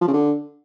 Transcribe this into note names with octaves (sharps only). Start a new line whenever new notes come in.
F3
C#3
D3